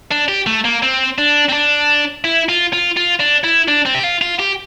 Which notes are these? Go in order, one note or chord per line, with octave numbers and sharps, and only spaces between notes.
D4
G4
A3
A#3
C4
D4
C4
D4
E4
F4
F4
F4
D4
E4
D4
C4
G4
F4
F4
G4